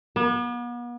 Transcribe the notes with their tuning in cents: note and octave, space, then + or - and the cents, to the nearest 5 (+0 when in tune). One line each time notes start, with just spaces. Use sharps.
B3 -40